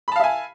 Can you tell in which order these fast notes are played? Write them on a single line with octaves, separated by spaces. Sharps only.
B5 A5 F5 E5 G#5